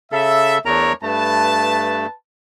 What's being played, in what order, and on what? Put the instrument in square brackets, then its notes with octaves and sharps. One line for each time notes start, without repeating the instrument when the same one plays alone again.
[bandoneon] C#3 A4 [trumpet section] E5
[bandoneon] E2 A#4 A#5 [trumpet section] A3 D4 C#5
[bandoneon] G2 A3 [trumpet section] B4 A5